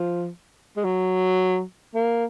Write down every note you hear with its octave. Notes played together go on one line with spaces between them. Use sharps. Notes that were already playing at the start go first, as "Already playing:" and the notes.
Already playing: F3
G#3
F#3
A#3